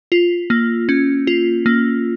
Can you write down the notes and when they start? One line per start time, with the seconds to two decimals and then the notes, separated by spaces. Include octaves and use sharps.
0.12 F4
0.50 A#3
0.89 C#4
1.27 F4
1.66 A#3